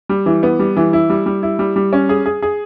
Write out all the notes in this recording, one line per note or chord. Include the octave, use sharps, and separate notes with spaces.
G3
E3
B3
G3
E3
E4
G3
G3
E4
G3
G3
C#4
G#4
G#4
G#4